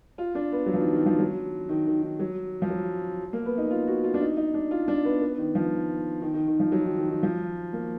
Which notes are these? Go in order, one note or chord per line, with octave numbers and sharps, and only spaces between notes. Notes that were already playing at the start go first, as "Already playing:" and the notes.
F4
D4
B3
F#3
F3
D#3
D#3
F3
F#3
D#3
D#3
D#3
F#3
F3
F#3
A#3
B3
D#4
F4
F#4
F4
D4
D#4
D#4
D4
F4
D4
B3
B3
D#3
F3
D#3
D#3
D#3
F3
F#3
D#3
D#3
D#3
F3
A#3